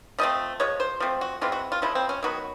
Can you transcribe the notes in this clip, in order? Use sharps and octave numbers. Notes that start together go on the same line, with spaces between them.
F3 A3 C4 D#5
F3 G#3 C#5
C5
F3 A3 C4
F#4
E3 G#3 C4 F4
F#4
F4
C#3 F3 G#3 E4
C4
C#4
D#3 F#3 B3 F#4